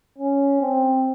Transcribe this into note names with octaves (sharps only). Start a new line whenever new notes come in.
C#4
C4